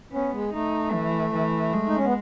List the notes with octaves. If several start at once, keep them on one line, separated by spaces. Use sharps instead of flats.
B3 C#4
G#3
A3 D#4
E3
E3
G#3
D#4
C#4
B3